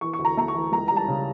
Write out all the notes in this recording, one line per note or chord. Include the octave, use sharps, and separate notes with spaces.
E3 C#6
C#6
D2
A#5
A3 A#5
C#6
E3
C#2 A#5
G3 A#5
A5
C#3